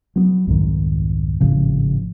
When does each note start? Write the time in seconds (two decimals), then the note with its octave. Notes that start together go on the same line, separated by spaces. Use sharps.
0.16 F#3 A#3 B3
0.47 C2 F2 G#2 D#3
1.40 G#1 A2 C#3 F3